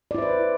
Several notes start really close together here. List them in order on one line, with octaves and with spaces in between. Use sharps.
D5 E4 C5 B4